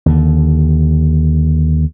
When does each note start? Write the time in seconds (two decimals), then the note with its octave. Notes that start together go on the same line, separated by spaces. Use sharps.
0.06 D#2 D3